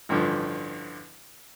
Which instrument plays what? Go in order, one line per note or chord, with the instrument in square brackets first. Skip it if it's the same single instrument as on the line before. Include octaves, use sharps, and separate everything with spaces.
[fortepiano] A1 G2 D3 F3